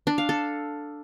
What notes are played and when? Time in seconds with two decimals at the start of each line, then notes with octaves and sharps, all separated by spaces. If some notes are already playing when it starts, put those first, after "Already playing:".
0.07 D4
0.18 F5
0.29 A4